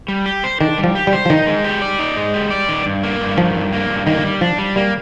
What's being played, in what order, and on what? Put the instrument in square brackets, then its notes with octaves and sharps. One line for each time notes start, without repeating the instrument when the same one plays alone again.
[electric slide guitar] G3
G4
C5
[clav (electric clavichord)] D#3 [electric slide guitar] D4
[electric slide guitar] G3
[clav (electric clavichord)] F3
[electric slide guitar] G4
[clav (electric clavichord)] G3
[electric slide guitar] C5
[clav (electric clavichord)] F3
[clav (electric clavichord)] D#3 [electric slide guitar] D#4
[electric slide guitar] G#3
G4
D5
D#4
G#3
G4
D5
D#3
G2
A#3
G2
[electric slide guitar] D#3 [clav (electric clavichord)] F3
[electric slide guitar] G2
A#3
G2
[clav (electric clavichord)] D#3 [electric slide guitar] A#3
[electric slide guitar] G3
[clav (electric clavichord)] F3 [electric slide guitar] D4
[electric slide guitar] G3
[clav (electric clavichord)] G3 [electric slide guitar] A#3